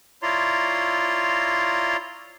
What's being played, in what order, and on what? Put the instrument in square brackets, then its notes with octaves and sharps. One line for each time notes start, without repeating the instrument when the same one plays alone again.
[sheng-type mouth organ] E4 F4 C#5 D5 A#5 C6